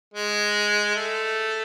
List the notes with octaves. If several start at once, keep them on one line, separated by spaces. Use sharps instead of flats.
G#3
A3